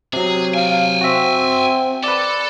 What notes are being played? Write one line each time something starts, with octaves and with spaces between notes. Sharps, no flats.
C3 F#3 G#4
F5 G5 G#5
C4 F#4 E5
A4 B4 D5